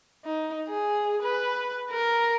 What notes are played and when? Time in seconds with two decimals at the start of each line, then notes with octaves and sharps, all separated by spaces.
0.25 D#4
0.68 G#4
1.22 B4
1.91 A#4